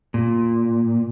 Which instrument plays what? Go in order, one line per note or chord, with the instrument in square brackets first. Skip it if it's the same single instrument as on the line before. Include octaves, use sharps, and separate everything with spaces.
[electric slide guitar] A#2